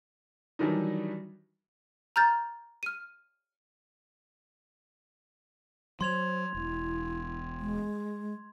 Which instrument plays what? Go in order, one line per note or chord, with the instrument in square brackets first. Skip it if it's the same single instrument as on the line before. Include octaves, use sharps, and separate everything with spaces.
[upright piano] D#3 E3 F#3 G3 D4 D#4
[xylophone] A#5 F6 G6 A6
F6 D#7
[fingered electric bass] F#3 [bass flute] C5 [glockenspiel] C6 G#6 F7
[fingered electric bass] E1 [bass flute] E4
[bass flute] G#3